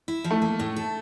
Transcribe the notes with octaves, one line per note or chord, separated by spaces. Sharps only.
E4
F3
A3
A#3
A2
A4